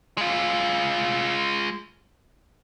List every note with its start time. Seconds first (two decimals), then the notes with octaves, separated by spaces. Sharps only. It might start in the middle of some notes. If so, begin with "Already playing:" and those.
0.18 G#3 F4